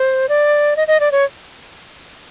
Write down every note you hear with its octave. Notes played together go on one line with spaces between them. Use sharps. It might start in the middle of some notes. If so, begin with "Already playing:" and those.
Already playing: C5
D5
D#5
D#5
D5
C#5